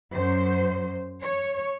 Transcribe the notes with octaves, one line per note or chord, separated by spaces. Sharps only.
F#2 C5
C#5